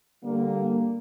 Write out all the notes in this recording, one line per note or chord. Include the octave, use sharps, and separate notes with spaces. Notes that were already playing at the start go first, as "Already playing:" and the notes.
D3 G3 A#3